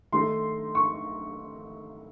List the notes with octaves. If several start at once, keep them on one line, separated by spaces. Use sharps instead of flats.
D#3 A3 D#4 C6
C#6